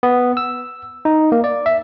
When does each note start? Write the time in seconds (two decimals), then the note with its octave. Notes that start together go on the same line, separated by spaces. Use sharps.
0.03 B3
0.37 E6
1.05 D#4
1.32 A#3
1.44 D5
1.66 E5